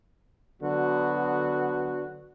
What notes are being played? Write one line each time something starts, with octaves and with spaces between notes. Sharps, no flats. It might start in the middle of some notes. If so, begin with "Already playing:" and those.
D3 F#3 B3 F#4